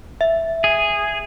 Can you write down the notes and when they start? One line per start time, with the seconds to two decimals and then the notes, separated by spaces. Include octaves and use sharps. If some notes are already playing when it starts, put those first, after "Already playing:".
0.21 E5
0.64 G#4